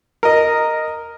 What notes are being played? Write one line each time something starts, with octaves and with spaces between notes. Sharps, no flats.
A#4 D#5